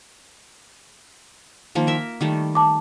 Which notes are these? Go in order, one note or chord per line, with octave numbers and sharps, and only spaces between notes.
D#3 F3 A#3
A#4 E5
D#3 G3 A3
A5 D6